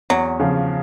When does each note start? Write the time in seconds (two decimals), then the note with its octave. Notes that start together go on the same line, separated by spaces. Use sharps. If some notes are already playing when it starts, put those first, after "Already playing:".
0.10 E2 F#3
0.39 C#3 F3